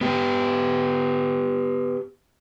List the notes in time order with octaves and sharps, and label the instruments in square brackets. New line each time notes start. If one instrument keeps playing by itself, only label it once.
[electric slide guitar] B3 G4